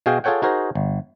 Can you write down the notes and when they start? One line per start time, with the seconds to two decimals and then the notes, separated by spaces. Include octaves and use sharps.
0.06 B2 F#4 G#4 F5 G5
0.24 F4 G#4 A4 C#5 F#5 G5
0.42 D#4 F#4 G#4 A#4 C5
0.75 G1